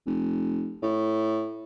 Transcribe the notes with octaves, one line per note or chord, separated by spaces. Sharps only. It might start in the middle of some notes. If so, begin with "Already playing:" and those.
F1
A2